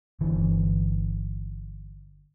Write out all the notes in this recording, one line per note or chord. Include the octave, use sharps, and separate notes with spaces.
G1 D3 E3